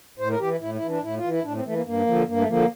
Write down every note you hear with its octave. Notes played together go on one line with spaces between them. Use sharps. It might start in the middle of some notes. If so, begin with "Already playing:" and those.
A2 C5
A#4
E3 G4
E4
A2 E4
E4
E3
D4
A2 E4
F4
E3
E4
A2 D4
C4
E3 A3
A#3
G2 A#3
D3 F3
G2 A#3
A3
D3 F3 A#3